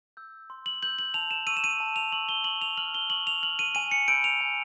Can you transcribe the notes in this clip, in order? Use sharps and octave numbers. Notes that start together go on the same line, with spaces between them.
E6 G6
C6
F#7
E6 G6 F#7
F#7
A5 F7
E7
C#6 E6 D#7
E7
D#7
A5
F7
C#6 E6 F#7
G7
C#6 F#7
F7
F6 F#7
G7
C#6 F#7
F7
F6 F#7
D#7
G#5 D#7
C#7
B5 E6 G6 D7
F7
G#5